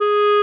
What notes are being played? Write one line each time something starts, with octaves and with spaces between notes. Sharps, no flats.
G#4